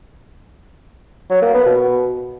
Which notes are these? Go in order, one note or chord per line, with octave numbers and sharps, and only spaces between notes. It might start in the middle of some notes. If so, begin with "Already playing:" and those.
F#3
A#3
B3
B2